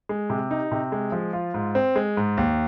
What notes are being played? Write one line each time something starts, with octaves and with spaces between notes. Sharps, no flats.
G#3
C3
D#4
C3
G#3
F3
F4
G#2
C4
G#3
G#2
D#2